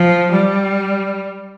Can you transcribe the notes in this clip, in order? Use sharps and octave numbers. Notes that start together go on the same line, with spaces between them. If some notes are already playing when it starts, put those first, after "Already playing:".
Already playing: F3
G3